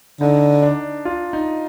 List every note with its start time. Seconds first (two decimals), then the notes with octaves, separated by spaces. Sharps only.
0.20 D3 D#4
0.62 D4
1.05 F4
1.33 D#4